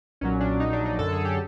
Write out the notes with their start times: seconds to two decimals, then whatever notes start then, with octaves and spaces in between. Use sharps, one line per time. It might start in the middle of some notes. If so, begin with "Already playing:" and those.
0.21 B1 A#2 F#3 C#4
0.40 D4
0.60 A#1 A#2 F#3 D#4
0.73 D4
0.86 D#4
0.99 F#2 D3 F#3 A4
1.12 G#4
1.25 G4